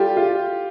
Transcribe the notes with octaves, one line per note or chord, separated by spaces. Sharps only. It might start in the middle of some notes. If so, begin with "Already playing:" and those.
Already playing: G3 F4 G4 A4
F4